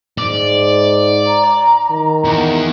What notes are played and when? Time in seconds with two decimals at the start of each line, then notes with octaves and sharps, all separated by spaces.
0.18 G#2 D5
1.27 A#5
1.91 D#3
2.25 E2